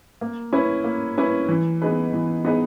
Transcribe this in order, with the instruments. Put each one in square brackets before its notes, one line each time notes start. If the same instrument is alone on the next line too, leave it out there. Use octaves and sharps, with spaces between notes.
[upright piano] A#3
C#4 E4 B4
A#3
C#4 E4 B4
E3
B3 D#4 G#4 B4
E3
B3 D#4 G#4 B4